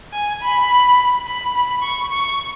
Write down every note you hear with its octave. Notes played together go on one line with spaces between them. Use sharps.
G#5
B5
B5
B5
C#6
C#6